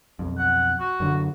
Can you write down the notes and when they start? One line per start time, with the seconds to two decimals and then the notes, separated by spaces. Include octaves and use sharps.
0.19 B1 F2
0.38 F#5
0.80 F#4
1.00 F#2 D3 F#3